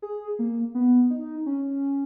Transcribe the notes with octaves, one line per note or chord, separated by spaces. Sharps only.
G#4
A#3
B3
D#4
C#4